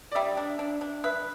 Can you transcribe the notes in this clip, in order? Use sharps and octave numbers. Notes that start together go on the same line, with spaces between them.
D5
G3 E5
D4
D4
D4
B4 E5